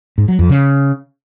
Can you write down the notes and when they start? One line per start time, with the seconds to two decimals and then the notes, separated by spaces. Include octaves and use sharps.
0.18 G#2
0.28 F#3
0.39 F2
0.49 C#3